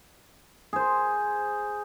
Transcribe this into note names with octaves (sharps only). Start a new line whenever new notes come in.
G#4 C5